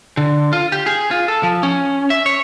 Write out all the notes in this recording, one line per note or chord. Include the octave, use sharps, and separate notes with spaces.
D3
F4
G4
G#4
F4
A4
F3
C#4
E5
C#5